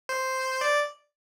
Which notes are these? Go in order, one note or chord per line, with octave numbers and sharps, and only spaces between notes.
C5
D5